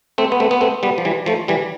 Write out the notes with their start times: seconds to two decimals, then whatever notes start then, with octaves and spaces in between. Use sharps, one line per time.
0.18 A3 C4
0.32 B3
0.40 A3 C4
0.51 B3
0.61 A3 C4
0.83 G3 B3
0.98 F3
1.05 E3 G3
1.26 F3 A3
1.48 E3 G3